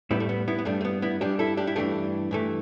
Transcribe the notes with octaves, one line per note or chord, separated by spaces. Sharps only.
A2 G3 B3 E4
A3
B3
B3 E4
B3
G2 G3 A3 D4
A3
B3
B3 E4
G2 G3 D4 G4
E4 A4
D4 G4
E4
G2 E3 A3 D4 G4
G2 E3 A3